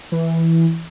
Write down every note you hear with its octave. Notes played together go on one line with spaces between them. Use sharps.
E3